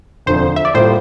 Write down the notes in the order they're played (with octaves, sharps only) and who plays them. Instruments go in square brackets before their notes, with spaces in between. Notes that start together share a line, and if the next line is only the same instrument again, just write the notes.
[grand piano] E1 D2 D3 F3 C4 [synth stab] C5
[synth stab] E5
D5
[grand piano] A2 G3 A#3 F4 [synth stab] C5